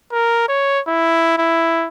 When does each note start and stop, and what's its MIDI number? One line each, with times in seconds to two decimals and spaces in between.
0.12 0.44 70
0.48 0.80 73
0.87 1.35 64
1.38 1.88 64